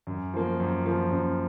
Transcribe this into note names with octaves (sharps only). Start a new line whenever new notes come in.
F#2
F3 A#3
F#2
F3 A#3
F#2